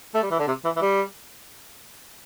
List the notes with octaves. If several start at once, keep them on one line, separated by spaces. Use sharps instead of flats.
A3
G3
E3
D3
C3
E3
E3
G3